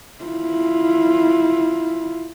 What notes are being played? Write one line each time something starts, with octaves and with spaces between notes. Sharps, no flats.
E4 F4